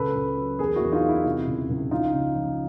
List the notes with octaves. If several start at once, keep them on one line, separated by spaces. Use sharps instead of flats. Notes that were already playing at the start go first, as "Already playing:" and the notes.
Already playing: C#2 A4 B4
C#2
F#3
E2 G#4 A#4
E4 F#4
E2
D#4 F4
E2
E4
C3 E4
C#2
C#2
F3 D#4 F4
C#3
F3